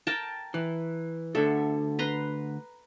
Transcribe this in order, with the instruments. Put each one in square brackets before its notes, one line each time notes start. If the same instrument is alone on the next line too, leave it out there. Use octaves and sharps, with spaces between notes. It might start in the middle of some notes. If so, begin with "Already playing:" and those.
[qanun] A#4 G5 A5
[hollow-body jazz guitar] E3
[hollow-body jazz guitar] D2 D3 [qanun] A4 E5
[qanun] B4 A#5 C6